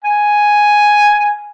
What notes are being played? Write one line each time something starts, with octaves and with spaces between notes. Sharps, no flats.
G#5